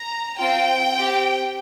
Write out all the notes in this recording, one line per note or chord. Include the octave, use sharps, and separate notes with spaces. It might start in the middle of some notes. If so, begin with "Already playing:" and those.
Already playing: A#5
C4 F4 G5
C4 G4